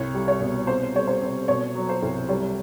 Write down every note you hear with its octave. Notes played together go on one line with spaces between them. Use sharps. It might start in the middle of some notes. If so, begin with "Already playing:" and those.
Already playing: C2 C#5
G3
C#5
B2
C3 C5
G3 C#5
C5
C3
B2 C#5
F#3
C5
C2
G3 C#5